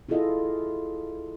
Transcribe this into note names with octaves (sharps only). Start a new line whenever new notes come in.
E4 F4 G#4 A4 D#5 F5